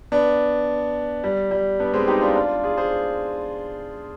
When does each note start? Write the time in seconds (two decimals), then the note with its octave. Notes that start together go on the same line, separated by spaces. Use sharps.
0.12 B3 D4
1.24 G3
1.51 G3
1.80 B3 D4
1.94 G#3 C4
2.07 D#4 G4
2.21 D4 F4
2.35 D4 F4
2.63 F4 G#4
2.77 G#4 C5